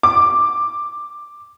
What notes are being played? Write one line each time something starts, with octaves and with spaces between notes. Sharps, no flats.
D6